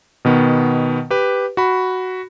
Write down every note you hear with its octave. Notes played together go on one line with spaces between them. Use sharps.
B2 D#3 B3
G4 B4
F#4 B5